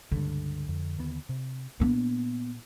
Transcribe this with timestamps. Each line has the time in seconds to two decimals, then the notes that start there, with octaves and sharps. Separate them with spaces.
0.12 C#2 G2 D3
0.68 F2
0.99 D#2 B3
1.29 C3
1.80 A#2 A#3 B3 D4